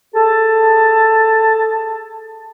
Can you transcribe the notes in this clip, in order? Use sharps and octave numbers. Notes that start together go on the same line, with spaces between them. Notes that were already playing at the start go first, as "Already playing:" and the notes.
G#4 A4 A5